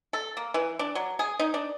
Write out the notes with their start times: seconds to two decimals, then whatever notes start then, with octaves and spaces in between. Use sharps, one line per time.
0.13 A4
0.37 A#3
0.54 E3
0.79 D4
0.95 F#3
1.19 G#4
1.39 D#4
1.54 D4